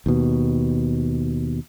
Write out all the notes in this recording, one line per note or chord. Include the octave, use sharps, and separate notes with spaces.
D#2 B2